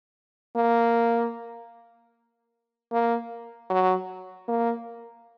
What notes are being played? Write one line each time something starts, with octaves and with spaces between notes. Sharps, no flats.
A#3
A#3
F#3
A#3